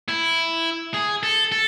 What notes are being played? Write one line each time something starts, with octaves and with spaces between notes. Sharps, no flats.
E4
G#4
A4
A4